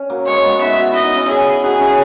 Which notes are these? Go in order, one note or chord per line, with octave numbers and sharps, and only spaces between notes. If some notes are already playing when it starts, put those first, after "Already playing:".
Already playing: C#4
F#3 A#3
G#3 C#5
G#3 B3
B3 D#4 E5
F#4
E4 D#5
D#4
C#4 E4
G#4
D#4 F#4 G#4
C#4 E4